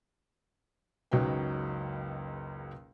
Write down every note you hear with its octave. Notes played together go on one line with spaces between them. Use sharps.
F#1 C#2 F#3 D#4 B4 G5